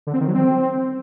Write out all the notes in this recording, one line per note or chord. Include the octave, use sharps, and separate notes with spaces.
D3
C4
D#3
F#3
C4